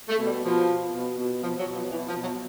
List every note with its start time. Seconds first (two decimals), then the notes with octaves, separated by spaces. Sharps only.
0.09 A3
0.18 B2
0.26 G3
0.42 B2 F3
0.67 B2
0.92 B2
1.17 B2
1.42 B2 F3
1.58 F#3
1.66 B2
1.75 F3
1.91 B2 E3
2.07 F3
2.16 B2
2.24 F#3